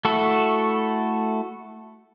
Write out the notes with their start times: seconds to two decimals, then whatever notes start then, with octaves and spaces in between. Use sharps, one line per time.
0.05 A3 E4 F#4 A4